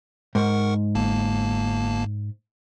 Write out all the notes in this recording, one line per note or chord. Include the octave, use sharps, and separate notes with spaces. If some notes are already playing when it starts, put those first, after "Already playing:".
G#2 A#4 F#5 C#6
G1 A#3 A5